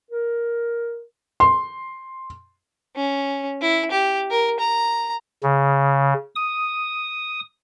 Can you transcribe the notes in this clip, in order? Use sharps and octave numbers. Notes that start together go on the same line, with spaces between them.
A#4
C6
C#4
E4
G4
A#4
A#5
C#3
D#6